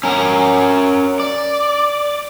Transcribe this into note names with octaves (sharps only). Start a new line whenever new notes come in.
C#4 A#4
D5